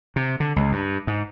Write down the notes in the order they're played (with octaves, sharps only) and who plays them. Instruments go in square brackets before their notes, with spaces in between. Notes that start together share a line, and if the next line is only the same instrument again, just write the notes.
[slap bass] C3
D3
C#2
G2
G#2